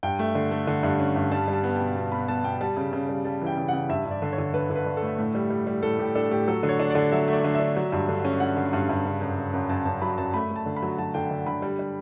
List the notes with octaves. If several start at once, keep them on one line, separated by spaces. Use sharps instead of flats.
G2 G5
A3
D3
A3
D3
G2
C#4
G2
G3 A5
G3
A5
B3
B2 G5
B2
B2 B5
B3 A5
B2 G5
G3 A5
C#3
C#3
G3
G3 A5
E3
G5
C#3
C#3 F#5
G2 E5
G2
D5
D3
C#5
D3
D3 B4
D3
B4
D3
A4
A3
A2
G3
G3
G3
A2 A4
A2 G4
D4 A4
A2 G4
F#3 A4
D3
C#5
D4
D3 D5
F#3 E5
A3
D5
D3
E5
D4
F#3
G2
D3
C#4
C#4 F#5
D3
G2
G2
C#3
F#2
C#3
F#2
F#2 A5
F#2 A5
F#3 B5
F#2 A5
A3 B5
A3
A5
D3
B5
F#3
F#3 A5
D3 G5
D3
D3 B5
G3
G3